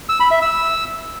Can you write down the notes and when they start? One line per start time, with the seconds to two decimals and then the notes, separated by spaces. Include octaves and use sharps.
0.09 E6
0.20 B5
0.31 E5
0.42 E6